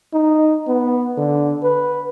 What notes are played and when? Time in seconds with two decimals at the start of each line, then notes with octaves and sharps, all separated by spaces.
0.13 D#4
0.67 B3
1.17 D3
1.63 B4